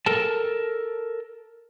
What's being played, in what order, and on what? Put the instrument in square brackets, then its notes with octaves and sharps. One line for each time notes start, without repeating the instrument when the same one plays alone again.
[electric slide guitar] A4 A#4 A5